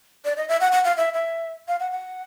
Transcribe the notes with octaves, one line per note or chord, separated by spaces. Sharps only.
D5
D#5
E5
F#5
F#5
F5
E5
E5
F5
F#5
F#5